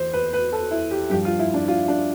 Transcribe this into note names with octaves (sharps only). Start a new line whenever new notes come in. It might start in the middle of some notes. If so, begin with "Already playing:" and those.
Already playing: E2 C5
B4
B4
A4
E4
G4
G2 F3 G4
F4
E4
D4
F4
D4